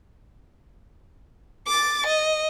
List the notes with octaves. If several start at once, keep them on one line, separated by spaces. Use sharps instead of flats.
D6 A6
D#5